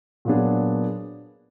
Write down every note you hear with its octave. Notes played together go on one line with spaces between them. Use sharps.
A#2 F#3 B3 D4 G#4